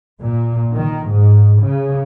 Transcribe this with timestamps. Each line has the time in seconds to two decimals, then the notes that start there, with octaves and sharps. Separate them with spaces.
0.20 A#2
0.73 D#3
1.07 G#2
1.62 C#3